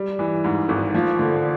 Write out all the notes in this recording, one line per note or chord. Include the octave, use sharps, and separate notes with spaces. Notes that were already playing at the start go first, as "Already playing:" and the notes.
Already playing: G3
E3
G#2
G#1
F3
D3